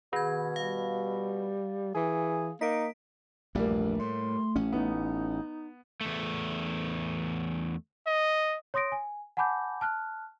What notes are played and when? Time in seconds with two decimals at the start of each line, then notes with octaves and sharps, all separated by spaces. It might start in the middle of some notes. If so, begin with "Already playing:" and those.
0.13 B2 D#3 G#6
0.56 G3 F5
1.95 E3 G#4
2.61 A#3 D#4 B6 D7
3.55 A#1 E2 G2 G3 A3 A#3
3.99 A2 C6
4.56 A1 C#4
4.73 B3 D#4
6.01 E2 A3
8.07 D#5
8.74 C#5 C6 D#6 A#6 D7
8.92 G#5
9.37 F#5 G#5 A5 B5 D6 G6
9.81 A5 F6 F#6